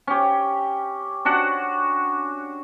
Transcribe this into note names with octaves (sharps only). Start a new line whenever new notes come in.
C#4 G4
C#4 D4 F#4 F#5